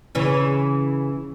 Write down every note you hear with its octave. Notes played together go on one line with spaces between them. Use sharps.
C#3 E3 C#4